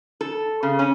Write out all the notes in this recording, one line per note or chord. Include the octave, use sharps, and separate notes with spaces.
A4
C#3
C#4